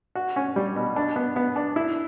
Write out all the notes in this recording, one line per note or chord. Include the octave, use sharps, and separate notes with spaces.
F#4
C#4
G3
B2
D4
B3
B3
D4
E4